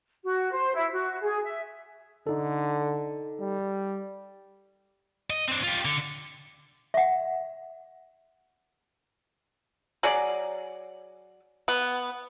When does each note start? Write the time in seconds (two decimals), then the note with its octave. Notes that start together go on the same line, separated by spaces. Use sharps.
0.23 F#4
0.53 C5
0.74 E4
0.92 F#4
1.22 G#4
1.44 E5
2.27 D3 D#4 A4
3.40 G3
5.30 D#5
5.48 C4 D4
5.63 F4 G4
5.85 D3
6.94 E5 F#5
10.03 F#3 G#4 D5
11.68 B3